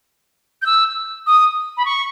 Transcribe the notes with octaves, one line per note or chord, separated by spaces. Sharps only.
G6
E6
D#6
B5
C#6